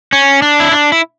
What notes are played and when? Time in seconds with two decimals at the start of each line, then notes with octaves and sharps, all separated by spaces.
0.13 C#4
0.42 D4
0.60 E4
0.71 D4
0.92 E4